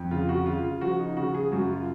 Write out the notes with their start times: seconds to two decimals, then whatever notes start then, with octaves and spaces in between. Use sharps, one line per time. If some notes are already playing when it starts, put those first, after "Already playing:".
Already playing: F2
0.11 C#3 F4
0.29 F#4
0.46 C#3 F4
0.64 F4
0.81 F3 F#4
0.99 D#4
1.16 C#3 F#4
1.34 G#4
1.52 F#2 F#4
1.69 F4